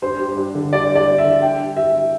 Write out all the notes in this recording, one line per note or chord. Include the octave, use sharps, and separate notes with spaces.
G2 C5
G3
G2
D3
G2 D5
G3
D5
G2
E5
D3
G2 G5
G2
G3 E5
G3